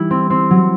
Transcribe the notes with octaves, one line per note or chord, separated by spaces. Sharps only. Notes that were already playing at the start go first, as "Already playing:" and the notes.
Already playing: E3 G3 E4
C4
C4
F#3